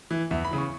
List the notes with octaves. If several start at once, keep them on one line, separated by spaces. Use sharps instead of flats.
E3
E2 E5
B5
C#3 E3
C#6